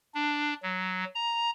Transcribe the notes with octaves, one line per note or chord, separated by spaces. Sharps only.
D4
F#3
A#5